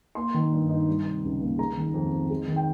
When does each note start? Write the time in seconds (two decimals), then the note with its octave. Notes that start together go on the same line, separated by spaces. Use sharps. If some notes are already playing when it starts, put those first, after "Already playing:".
0.15 A#3 C6
0.34 D#3
0.52 G2
0.69 D#4
0.88 G3
1.05 C3
1.23 C#2
1.41 A#3
1.58 G#3 A#5
1.77 D#3
1.94 F2
2.12 C4
2.31 G#3
2.48 D#3
2.56 G5